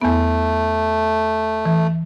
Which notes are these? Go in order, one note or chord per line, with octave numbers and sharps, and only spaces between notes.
E2 A3 B3
E3